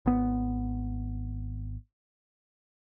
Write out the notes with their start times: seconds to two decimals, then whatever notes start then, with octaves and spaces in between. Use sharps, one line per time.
0.06 G#1 B3